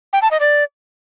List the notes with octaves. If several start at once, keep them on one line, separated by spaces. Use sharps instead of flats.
G5
A5
D#5
D5